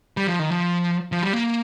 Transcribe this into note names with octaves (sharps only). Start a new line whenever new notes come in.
G3
F3
D#3
F3
F3
G3
A#3